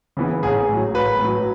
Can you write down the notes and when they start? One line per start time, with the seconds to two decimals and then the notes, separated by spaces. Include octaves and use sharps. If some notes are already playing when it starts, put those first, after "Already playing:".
0.17 C#3 E3 B3
0.43 A1 G#4
0.69 A2 F#3
0.94 A1 B4
1.19 A2 F#3